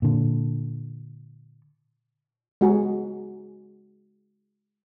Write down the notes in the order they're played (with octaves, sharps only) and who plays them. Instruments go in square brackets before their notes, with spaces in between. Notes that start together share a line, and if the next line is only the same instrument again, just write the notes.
[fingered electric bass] A#2 D3
[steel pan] G#3 F#4 G#4